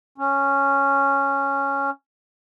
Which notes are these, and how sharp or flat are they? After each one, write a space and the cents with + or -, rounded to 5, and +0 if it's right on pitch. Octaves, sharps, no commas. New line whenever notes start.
C#4 -5